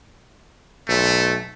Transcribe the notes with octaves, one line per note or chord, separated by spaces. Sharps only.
B1 A3